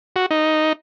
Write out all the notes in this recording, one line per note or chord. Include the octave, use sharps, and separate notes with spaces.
F#4
D#4